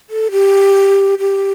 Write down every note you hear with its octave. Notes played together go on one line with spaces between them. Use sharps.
A4
G4
G4